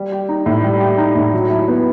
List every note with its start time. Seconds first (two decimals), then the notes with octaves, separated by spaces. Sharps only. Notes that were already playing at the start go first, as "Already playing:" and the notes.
Already playing: G3
0.12 G4
0.29 D#4
0.46 A2
0.64 G3
0.81 G4
0.98 D#4
1.15 A2
1.33 F#3
1.50 E4
1.68 B3